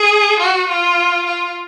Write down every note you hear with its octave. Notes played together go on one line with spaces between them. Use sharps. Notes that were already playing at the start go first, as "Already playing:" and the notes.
Already playing: G#4
F#4
F4
F4